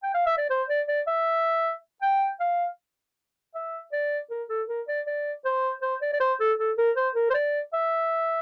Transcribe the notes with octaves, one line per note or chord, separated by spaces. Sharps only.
G5
F5
E5
D5
C5
D5
D5
E5
G5
F5
E5
D5
A#4
A4
A#4
D5
D5
C5
C5
D5
D5
C5
A4
A4
A#4
C5
A#4
C5
D5
E5